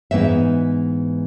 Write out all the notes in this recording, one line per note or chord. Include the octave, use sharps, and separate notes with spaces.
G#2 E3 B3 D#4 E5